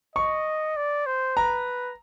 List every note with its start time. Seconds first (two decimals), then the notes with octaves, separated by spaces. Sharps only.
0.16 D#5 C#6
0.77 D5
1.06 C5
1.36 B4 A#5